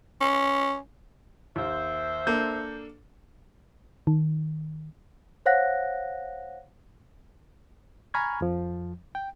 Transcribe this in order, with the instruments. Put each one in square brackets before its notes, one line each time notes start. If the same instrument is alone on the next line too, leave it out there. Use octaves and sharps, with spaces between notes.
[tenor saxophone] C#4
[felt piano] D#2 [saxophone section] C5 E5
[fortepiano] A#3 [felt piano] D4 A4 [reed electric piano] G6
[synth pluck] D#3
[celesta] C5 C#5 F5 F#5 F#6 A#6
[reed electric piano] G#5 A#5 B5 C#6 F6 G#6
F2 F3
G5